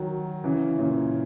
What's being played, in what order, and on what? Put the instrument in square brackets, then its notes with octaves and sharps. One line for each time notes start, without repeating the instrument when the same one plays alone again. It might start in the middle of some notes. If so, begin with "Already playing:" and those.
Already playing: [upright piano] D#3 F#3
C#3 E3
A#2 C#3